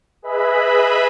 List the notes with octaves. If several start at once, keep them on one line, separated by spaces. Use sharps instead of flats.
G#4 B4 D#5 E5 B5